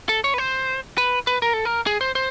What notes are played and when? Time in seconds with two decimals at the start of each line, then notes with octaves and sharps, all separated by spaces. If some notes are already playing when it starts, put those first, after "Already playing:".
0.09 A4
0.24 C#5
0.34 B4
0.38 C5
0.98 B4
1.27 B4
1.42 A#4
1.53 A4
1.65 A#4
1.86 G#4
2.01 C5
2.15 C5